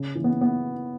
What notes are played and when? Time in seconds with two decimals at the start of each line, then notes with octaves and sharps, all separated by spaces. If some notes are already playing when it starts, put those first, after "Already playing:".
Already playing: C#3
0.15 E3
0.24 B3
0.41 B3